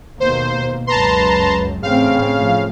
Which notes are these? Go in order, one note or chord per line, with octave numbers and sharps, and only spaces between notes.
D#2 B2 A#3 C5
C#2 F#2 B4 A5 A#5 C6
A1 A2 C#3 C4 F5
A2 F3